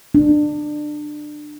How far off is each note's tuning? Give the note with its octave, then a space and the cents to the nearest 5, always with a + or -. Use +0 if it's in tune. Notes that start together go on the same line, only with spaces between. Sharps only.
D4 +25